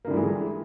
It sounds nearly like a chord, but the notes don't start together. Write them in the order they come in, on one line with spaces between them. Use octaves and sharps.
A#3 D3 G3 E3 G#3